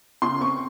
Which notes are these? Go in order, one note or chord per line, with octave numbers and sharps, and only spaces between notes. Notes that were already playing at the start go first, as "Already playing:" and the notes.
C#3 C6
C4 C#6